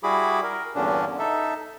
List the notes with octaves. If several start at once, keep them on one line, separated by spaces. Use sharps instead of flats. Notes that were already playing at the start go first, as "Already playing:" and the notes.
G3 E4 F#4 G#4 B5 D6
A#4
E2 G2 A#2 D3 C#4 D4
D#4 A4 E5